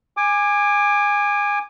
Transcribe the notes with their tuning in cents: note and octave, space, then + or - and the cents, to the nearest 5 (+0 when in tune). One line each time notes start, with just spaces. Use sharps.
G#5 -15 D6 +20